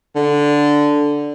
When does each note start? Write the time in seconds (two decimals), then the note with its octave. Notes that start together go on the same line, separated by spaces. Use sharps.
0.16 D3